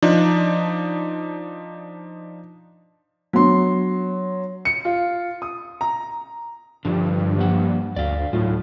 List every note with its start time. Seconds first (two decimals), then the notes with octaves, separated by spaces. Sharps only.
0.02 F3 D4 D#4
3.33 F#3 B3 D4 C6
4.65 C#7
4.85 F4
5.42 D#6
5.81 A#5
6.85 G2 D3 F3 D4
7.37 F3 A#3 F#5
7.96 D2 D5 F5
8.33 A2 F#3 D#4 F4